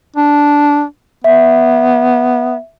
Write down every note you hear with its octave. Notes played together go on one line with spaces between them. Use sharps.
D4
B3 E5